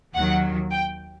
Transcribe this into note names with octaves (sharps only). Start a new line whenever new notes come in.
D#2 D#3 F#3 F#5
G5